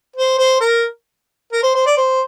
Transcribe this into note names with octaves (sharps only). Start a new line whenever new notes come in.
C5
C5
A#4
A#4
C5
C5
D5
C5